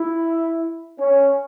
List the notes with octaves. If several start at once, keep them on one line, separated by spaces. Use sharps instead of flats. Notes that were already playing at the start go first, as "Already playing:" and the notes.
Already playing: E4
C#4